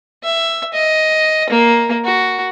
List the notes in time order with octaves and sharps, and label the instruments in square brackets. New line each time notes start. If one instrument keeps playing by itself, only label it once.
[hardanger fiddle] E5
D#5
A#3
F#4